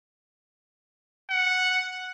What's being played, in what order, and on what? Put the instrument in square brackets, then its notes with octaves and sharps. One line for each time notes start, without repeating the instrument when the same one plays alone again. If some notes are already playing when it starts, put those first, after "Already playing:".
[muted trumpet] F#5